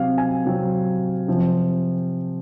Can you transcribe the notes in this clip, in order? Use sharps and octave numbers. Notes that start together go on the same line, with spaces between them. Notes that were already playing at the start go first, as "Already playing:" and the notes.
Already playing: C3 F#3 C4 F5
G#5
C3 F#3 C4
C3 F3 C4